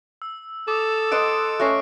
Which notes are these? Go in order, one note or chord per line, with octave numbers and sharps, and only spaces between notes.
E6
A4 D6 D#6
C5 D#5 F#5 D7
A3 C#4 C#6 F#6 A#6 C7